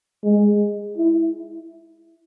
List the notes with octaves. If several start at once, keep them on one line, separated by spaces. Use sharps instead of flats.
G#3
E4